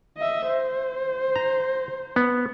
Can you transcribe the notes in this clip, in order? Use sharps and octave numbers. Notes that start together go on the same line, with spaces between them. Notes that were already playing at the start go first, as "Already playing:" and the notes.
D#5 E5
C5
A#5
B3